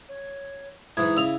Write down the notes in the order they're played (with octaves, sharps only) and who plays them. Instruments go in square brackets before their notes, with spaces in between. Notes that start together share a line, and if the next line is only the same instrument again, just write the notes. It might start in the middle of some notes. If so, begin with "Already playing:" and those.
[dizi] C#5
[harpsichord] G#2 E3 [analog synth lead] E4 [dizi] D#6 [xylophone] G#6
[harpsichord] C#3 [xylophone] E6 F7